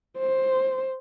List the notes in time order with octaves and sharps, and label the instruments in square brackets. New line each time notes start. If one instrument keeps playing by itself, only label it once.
[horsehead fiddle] C5